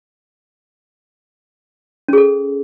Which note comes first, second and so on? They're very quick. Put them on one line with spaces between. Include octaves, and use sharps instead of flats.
C#4 G#4 A4